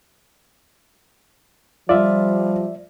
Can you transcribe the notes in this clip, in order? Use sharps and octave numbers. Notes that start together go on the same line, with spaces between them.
F3 G3 F4 D5 E5